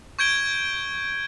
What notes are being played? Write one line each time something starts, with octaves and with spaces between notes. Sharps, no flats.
C#6 G6 G#6 D7 G7